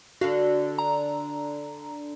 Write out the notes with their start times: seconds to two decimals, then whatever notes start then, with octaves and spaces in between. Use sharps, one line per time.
0.21 D3 D4 F#4 F5
0.78 A#5